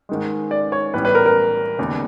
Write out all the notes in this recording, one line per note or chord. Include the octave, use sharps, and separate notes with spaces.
G#2 D#3 G#3
D5
C#5
A1 A2 E3 G3 B3 B4
B4
A#4
A#4
E1 D#2 C#3